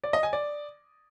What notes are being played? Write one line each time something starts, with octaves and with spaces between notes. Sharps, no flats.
D5
D#5
G#5
D5